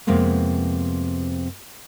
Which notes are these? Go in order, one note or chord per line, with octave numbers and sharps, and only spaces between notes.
F2 C3 G#3 A#3 B3